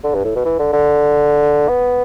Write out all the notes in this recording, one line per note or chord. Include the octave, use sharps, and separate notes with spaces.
D3
G2
A2
B2
E3
D3
D3
B3